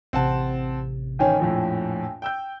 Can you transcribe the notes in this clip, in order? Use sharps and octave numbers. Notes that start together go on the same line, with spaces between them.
A1 C3 C4 F#5 A5
A1 D#3 C#4 G5 G#5
A#1 F2 A2
G5 E6 G6